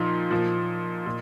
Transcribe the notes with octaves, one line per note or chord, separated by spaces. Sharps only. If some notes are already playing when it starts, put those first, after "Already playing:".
Already playing: A#2 F3 D#4
A#2 F3
A#2